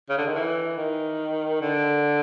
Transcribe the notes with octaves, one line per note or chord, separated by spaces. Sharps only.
C#3
D3
D#3
E3
D#3
D3